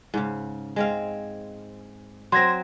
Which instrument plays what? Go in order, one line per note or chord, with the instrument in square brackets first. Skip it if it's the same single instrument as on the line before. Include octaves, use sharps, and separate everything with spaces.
[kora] G#2 C#3
G#3 C4 F5
[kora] F#3 C4 [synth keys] C6 G#6 A#6